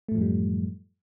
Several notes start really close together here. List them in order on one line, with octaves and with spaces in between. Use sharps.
A3 A2 F3 F#2 G3